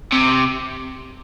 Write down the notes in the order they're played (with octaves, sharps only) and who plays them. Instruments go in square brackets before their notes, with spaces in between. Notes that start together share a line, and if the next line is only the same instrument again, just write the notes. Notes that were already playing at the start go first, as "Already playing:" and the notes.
[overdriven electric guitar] C3